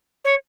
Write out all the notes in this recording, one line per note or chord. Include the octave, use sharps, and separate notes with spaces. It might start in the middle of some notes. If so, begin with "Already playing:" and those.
C#5